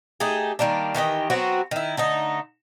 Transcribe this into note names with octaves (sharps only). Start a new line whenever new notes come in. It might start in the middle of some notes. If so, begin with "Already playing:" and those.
A3 D#4 G4 G#4
D#3 G3 A#3 D4
D#3 E3 G4 D#5
F#3 B3 C4 F#4
D#3 E4
D3 A3 D#4